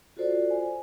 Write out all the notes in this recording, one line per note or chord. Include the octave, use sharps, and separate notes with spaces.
F4 F#4 A4 C5 D5
G#5